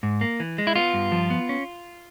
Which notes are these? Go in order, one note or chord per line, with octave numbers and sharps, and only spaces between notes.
G#2
A#3
E3
G#3
E4
B3 F4
G2
F3
B3
C#4